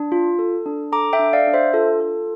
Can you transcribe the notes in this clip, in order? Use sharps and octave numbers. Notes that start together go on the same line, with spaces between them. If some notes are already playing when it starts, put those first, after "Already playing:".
Already playing: D4
F4
A4
D4
A4 A#5 D6
E5 G5
D4
D5 F5
D4
C5 E5
F4 A4
A4